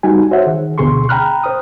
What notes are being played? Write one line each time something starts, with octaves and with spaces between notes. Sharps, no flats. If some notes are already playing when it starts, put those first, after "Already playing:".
G3 D#4 F#4 G#5
F#4 C5 C#5 E5 F#5
D#3 G#4
D2 B2 D3 G#4 C6 C#6
G5 A#5 B5 F6 F#6
C5 D#6